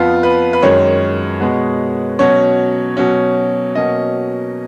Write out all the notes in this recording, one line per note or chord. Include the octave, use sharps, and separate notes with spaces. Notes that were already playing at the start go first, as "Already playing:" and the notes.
Already playing: F2 F3 B3 F4
B4
B4
F#2 D#3 G#3 C#4 C#5
B2 G#3 B3
B2 F#3 C#4 C#5
B2 F#3 C#4
B2 F#3 A#3 C#4 D#5